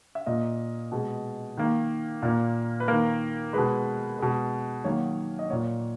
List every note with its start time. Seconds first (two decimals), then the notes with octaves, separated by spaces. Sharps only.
0.15 E5
0.26 A#2 A#3 D#5
0.92 B2 G#3
1.57 D#3 A#3
2.22 A#2 A#3
2.80 B4
2.88 D#3 A#3 A#4
3.53 B2 G#3 B4
4.19 B2 G#3
4.84 D#3 F#3 A#3 C#5
5.39 D#5
5.50 A#2 A#3 C#5